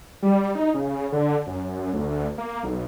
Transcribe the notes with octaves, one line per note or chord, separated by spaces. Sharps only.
G3
D#4
C#3
D3
F#2
F#2
D2
A#3
B1